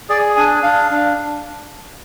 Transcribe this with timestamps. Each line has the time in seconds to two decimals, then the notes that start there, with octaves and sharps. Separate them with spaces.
0.09 G#4 D5
0.36 D4 G#5
0.63 D4 F5
0.91 D4